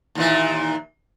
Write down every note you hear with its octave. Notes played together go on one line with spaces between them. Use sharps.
D#2 A#2 E3